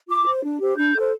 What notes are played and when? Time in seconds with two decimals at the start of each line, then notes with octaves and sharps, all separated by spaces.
0.08 F4 D6
0.26 C5
0.43 D4
0.60 G4 C5
0.77 D4 G6
0.94 A4 C5